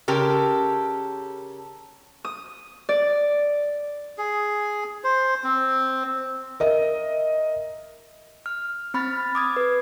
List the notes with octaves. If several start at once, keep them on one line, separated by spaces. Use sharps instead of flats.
C#3 G4 A4 A#4 C6
D#6
D5
G#4
C5
C4
A#4 D#5 E5
F6
C4 B5 F6 A6
D6 D#6 G#6
B4